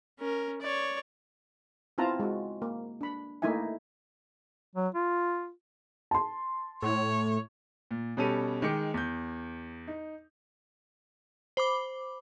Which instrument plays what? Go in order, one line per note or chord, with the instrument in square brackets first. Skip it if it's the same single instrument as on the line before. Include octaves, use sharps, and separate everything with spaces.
[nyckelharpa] C#4 A#4
C#5 D5
[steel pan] B3 C4 E4 F4 A5 A#5
G#3 F#4
A#3
D4 B5
A3 A#3 D#4 E4 E5 G#5
[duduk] F#3
F4
[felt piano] A5 C6
[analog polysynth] A2 [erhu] C#5
[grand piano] A#2
B2 G3 C#4 G4 A4 D#7
D#3 G#3 G5 D6 C#7
E2 G6
D#4
[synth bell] C5 B5 D6